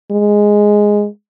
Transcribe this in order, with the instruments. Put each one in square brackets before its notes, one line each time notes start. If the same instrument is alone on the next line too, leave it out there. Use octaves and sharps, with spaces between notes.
[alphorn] G#3